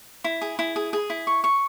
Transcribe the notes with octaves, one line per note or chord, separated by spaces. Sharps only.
E4
G#4
E4
G#4
G#4
E4
C#6
C#6